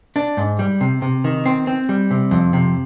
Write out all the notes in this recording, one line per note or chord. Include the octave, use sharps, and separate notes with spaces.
D4
G#2
G3
C3
C3
D#3
C4
C4
G3
C3
F2
C3